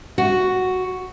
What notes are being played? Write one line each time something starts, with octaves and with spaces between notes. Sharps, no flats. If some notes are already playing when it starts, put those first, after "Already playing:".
F#4